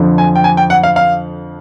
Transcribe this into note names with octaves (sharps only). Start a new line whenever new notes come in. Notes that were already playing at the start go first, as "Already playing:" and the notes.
Already playing: F2 D3 F3
G#5
G5
G#5
G5
F#5
F5
F5